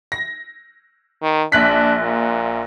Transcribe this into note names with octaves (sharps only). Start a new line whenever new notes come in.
A#6
D#3
A#1 D4 F#6 B6
A#2